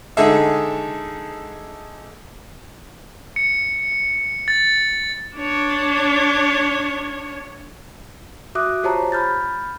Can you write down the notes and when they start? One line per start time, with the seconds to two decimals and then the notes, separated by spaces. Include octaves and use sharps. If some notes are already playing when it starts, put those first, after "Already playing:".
0.17 D3 G#3 D#4 G#4 A4 E5
3.36 C#7
4.48 A6
5.37 D4 C#5
8.55 F#4 E5 D6 D#6 F#6
8.83 F4 G4 C5 C#5 A5 A#5
9.12 B5 F6 G6 A6